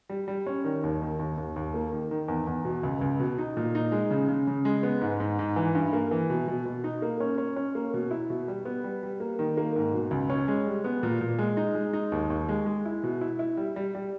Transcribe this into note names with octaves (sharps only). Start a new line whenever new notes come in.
G3
G3
C#4
D#3
D#2
D#3
D#2
D#2
D#2
A#3
D#3
D#3
E2
E2
B2
C#2
C#2
B2
D#4
A#2
D#4
G#3
C#3
C#3
C#3
G#3
B3
G#2
G#2
G#2
E3
G2
A#3
E3
B2
B2
B2
D#4
A#3
C#4
C#4
C#4
A#3
B2
E4
B2
G3
B3
G3
G3
A#3
D#3
A#3
G#2
B2
C#2
C#4
G#3
G3
B3
A#2
A#2
G#3
D#4
G#3
D#4
D#2
D#2
G#3
G#3
E4
B2
E4
E4
G3
G3
G3